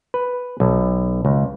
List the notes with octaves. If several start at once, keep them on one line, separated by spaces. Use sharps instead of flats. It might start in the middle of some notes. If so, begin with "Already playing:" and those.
B4
B1
C#2